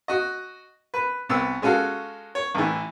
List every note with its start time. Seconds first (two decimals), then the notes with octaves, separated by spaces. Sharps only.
0.08 F#4 D#5
0.94 B4
1.29 C2 B3 E6
1.62 G#3 C#4 F4 F#4 A4 F5
2.35 C#5
2.55 A1 E3